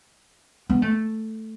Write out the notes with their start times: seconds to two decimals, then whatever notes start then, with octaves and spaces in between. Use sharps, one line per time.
0.70 B3
0.82 A3